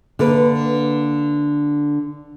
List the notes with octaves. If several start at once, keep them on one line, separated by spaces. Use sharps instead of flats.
D3 A#3 B4